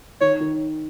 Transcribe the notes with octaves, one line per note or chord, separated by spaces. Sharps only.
D#3 C#5
D#3